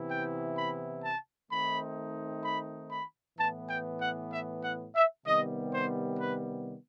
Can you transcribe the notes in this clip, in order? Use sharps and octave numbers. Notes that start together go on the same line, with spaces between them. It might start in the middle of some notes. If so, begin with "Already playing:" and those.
Already playing: C3 E3 B3 E4
G5
B5
A5
D#3 A3 C4 D#4 B5
B5
B5
A2 E3 B3 A5
G5
F#5
E5
F#5
E5
C3 D#3 G3 B3 D#5
C5
B4